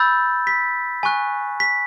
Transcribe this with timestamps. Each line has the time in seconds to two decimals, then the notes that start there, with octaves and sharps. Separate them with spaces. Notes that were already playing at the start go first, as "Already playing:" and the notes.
Already playing: B5 E6 G6 A6
0.47 B6
1.03 G#5 C#6 F#6
1.60 B6